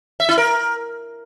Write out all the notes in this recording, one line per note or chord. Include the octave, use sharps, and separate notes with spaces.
E5
E4
A#4